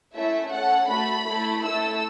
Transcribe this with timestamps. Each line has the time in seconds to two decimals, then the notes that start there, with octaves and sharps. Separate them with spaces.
0.14 A3 C#4 E4 E5
0.52 C#4 A4 F#5
0.89 A3 F#4 A4 B5
1.27 A3 E4 A4
1.64 A3 E4 A4 E6